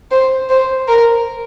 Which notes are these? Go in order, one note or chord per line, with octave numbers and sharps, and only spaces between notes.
C5
C5
A#4